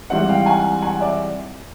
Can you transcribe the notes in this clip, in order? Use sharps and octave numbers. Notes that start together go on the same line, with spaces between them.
G#2 E3 G3 C4 E5 F#5
F5 G5
F#5 G#5
F#5 G#5
D5 E5